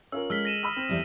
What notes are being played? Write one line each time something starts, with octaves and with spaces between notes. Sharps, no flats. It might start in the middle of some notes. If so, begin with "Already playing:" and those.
C#4 F4 A#4 E6
G#3 E6 F6 B6
A#6 D#7 E7
B5 D#6 E6
C4
E2 G3 E4